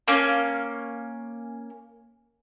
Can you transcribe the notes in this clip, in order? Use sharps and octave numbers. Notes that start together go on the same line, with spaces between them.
A#3 C#4